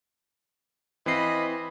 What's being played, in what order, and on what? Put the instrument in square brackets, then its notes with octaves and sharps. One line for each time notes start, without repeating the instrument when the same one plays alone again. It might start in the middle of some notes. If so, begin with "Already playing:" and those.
[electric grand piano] E3 C4 C7 [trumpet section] D#5 F5 B5